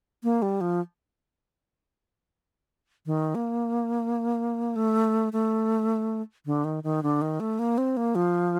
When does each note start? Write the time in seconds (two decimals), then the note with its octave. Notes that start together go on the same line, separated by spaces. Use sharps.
0.23 A#3
0.42 G3
0.61 F3
3.06 D#3
3.35 A#3
4.76 A3
5.33 A3
6.46 D3
6.64 D#3
6.84 D#3
7.03 D3
7.22 D#3
7.40 A3
7.59 A#3
7.78 C4
7.97 A#3
8.15 F3